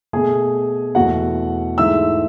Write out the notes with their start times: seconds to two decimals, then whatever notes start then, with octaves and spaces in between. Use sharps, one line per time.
0.13 B2 A3 G#4 G#5
0.95 E2 B2 A3 F#4 F#5
1.78 G#2 E3 A3 E5 E6